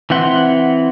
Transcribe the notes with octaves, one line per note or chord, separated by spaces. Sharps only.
E3 C4 E5 F#5 C6